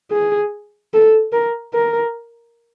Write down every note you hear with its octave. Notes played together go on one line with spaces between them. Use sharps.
G#4
A4
A#4
A#4